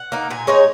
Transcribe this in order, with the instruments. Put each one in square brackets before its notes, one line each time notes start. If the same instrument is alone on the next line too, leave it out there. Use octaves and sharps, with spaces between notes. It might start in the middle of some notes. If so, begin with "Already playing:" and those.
Already playing: [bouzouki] F#5
A#3 D#4
A#2 G#5
G#3 D#4 C#5